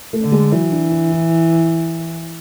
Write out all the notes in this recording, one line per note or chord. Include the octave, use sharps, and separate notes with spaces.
A3
D3
G#3
E3 F#3
D4
D4
E4